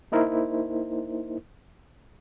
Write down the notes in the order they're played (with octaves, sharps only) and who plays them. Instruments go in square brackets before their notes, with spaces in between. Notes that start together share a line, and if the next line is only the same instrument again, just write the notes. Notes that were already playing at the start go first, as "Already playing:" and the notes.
[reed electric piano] A#3 D#4 E4 A#4 C5